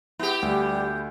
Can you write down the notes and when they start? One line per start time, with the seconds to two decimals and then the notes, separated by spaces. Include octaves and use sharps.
0.19 B3 E4 G4
0.43 D2 G3